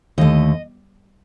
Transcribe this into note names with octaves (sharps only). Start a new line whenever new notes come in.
D#2 D3 A3 D#5